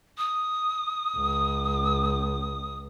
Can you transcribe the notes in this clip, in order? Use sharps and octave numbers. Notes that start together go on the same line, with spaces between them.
D#6
C#2